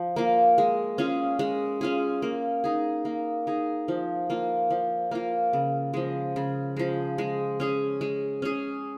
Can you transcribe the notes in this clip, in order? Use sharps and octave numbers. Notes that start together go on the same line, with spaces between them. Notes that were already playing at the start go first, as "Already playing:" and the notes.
Already playing: F3
A#3 F4
G#3
C#4 F4 G#4
G#3
C#4 F4 G#4
A#3
D#4 G#4
A#3
D#4 G#4
F3
A#3 F4
F3
A#3 F4
C#3
F3 G#3
C#3
F3 G#3
G#3
C#4 G#4
G#3
C#4 G#4